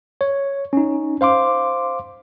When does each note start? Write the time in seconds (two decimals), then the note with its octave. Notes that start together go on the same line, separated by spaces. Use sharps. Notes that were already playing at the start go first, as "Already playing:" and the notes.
0.21 C#5
0.73 C#4 D#4
1.21 C5 F5 C6 D6